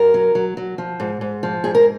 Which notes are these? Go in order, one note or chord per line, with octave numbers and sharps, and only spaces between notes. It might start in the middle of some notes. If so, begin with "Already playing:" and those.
Already playing: F#2 A#4
F#3
F#3
F#3
F3
G#2
G#2
F3
G#2 G#4
A#4